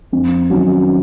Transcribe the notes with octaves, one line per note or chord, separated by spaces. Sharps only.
F2
D#3 F#3 C#4 F#4